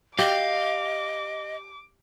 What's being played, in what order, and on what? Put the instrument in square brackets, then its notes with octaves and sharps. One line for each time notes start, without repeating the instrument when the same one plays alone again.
[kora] G4 [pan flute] D#5 [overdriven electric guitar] F5 [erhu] D6